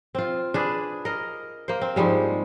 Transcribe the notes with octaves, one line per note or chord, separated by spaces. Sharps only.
C4 F4
D4 G#4 B4
A#4 D#5
A#3 C5
C4
G#2 F3 G3 G#3